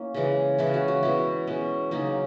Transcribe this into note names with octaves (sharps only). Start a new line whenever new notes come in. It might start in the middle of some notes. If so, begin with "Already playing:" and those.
Already playing: A#3 C#4 E4
C#3 E3 G#3
C#3 E3 G#3 E4
F#4
F#4
B2 G#3 C#4 E4
B2 G#3 C#4
C#3 F#3 A#3 C#4 D#4